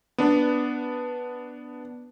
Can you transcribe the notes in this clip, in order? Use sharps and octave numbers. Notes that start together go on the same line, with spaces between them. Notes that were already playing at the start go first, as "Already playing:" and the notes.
B3 D4